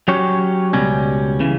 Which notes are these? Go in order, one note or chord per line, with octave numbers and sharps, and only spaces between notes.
F#3 C#4 G4 C#5
C#2 B2 G3 C#4
C#3 E3